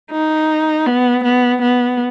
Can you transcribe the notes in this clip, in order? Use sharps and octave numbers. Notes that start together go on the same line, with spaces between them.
D#4
B3
B3
B3